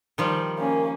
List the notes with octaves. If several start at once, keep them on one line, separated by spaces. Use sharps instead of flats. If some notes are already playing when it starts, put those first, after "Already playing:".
D#3 F3 G3
A#3 C#4